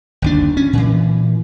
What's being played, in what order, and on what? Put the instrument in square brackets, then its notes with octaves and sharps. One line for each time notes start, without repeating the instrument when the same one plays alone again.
[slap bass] G1 D#2 D4
C#4
A#2 E3